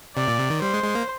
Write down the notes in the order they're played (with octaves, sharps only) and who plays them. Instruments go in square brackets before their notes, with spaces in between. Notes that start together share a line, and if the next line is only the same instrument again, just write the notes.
[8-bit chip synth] C3 [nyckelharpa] D5
[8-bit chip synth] A#2
C3
D#3
[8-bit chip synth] G3 [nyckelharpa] C5
[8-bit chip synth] G#3
G#3
A#3